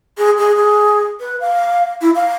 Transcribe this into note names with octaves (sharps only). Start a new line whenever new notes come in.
G#4
G#4
G#4
B4
F5
E4
F5